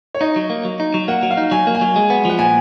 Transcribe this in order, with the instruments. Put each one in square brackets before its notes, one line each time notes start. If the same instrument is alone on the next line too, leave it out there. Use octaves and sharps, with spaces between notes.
[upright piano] C#5
[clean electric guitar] D#4 [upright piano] D#5
[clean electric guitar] F#3
A#3
F#3
D#4
F#3
[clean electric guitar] A#3 [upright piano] F#5
[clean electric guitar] F#3
[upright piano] F5
[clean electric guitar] D#4
[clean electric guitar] F#3 [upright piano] G#5
[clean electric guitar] A#3
[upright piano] G#5
[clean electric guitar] F#3
G#3
B3
[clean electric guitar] F3 [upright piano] F#5
[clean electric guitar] A#2 [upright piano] G#5